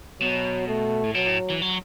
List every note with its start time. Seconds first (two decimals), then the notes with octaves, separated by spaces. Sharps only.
0.21 B2 F#3
0.68 A3
1.03 A2
1.14 B2 F#3
1.26 A2
1.50 E3
1.62 F#3